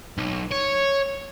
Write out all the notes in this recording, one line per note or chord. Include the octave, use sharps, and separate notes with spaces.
B1
C#5